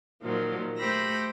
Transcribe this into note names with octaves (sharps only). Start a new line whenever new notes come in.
A#2 D#3 F3 F#3
A3 G4 C5 B5 E6 A#6